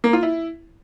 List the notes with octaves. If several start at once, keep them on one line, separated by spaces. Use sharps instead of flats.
A#3
F4
E4